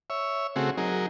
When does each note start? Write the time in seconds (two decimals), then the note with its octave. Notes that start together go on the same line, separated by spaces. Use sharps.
0.10 C#5 E5
0.56 C#3 A3 C4 F#4 G#4
0.77 F#3 D#4 G#4 A#4